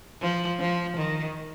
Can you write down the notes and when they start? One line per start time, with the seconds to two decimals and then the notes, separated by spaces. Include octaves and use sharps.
0.21 F3
0.60 F3
0.97 D#3